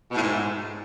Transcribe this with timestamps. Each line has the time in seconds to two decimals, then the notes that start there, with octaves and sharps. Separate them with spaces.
0.11 B2
0.16 A2
0.21 G#2